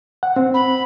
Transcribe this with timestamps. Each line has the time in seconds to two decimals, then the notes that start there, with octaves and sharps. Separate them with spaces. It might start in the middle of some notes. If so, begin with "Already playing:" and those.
0.23 F#5
0.36 C4
0.54 B5